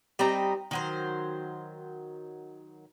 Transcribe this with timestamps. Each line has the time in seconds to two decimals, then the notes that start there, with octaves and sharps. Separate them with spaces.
0.19 G3 C4 D#4 A#5
0.71 D#3 F#3 C5